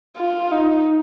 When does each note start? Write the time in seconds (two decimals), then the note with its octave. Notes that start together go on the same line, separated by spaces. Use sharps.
0.16 F4
0.51 D#4